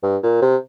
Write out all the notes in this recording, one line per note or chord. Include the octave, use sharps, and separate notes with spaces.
G2
A#2
C3